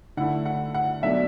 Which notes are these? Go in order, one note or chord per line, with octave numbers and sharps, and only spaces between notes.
D3 A3 E4 F#5
F#5
F#5
B2 F#3 A3 D4 E5